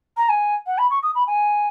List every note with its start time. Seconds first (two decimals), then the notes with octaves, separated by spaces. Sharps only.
0.17 A#5
0.29 G#5
0.67 F#5
0.78 B5
0.90 C#6
1.03 D#6
1.15 B5
1.27 G#5